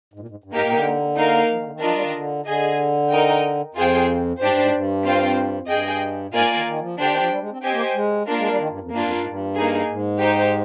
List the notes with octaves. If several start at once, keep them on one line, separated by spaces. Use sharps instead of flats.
G#2
A#2
G#2
G2
G#2 A#3 D#4 G4 A#4
A#2
C3
D3
A#3 D#4 A#4 F5
F3
D#3
D3
D#3
F3 D4 F4 A#4 D#5
G3
D#3
D3
D3 G#4 D#5 G#5
D#4 A#4 D#5 G5
F2 F4 G#4 C5 G5
G#2 D4 G4 C5
G2
G#2
G2
C4 F4 C5 G5
F2
G2 G#4 D#5 G5
A#2
G#2 A#3 F4 A#4 D5 G#5
D#3
D#3
F3
D3 D4 G4 C5 G5
D#3
F3
G3
G#3
C4
C4 G4 C5 D#5 G#5
A#3
G#3
A#3 D4 F4 A#4
G#3
G3
D#3
G2
F2
G2 A#3 D4 F4
F2
G2
G#2
G2
A#3 D#4 G#4
G#2
D#4 G4 C5